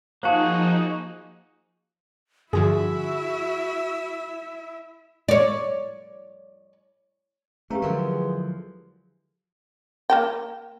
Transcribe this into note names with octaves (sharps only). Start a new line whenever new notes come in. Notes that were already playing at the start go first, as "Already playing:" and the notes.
F3 A#3 D#4 F#4 G#4 C5 F5 A5
G2 D3 F3 E4 F#4 G#4 E5
C#5 D5
E2 A3 C#4 G4 F5 A#5
D3 F3 F#3 G#3 A#4 F5
A#3 A#4 G5